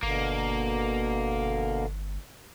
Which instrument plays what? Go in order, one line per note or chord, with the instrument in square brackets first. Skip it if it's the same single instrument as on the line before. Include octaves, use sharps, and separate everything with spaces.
[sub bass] G1 [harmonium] B2 D3 [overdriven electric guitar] A#3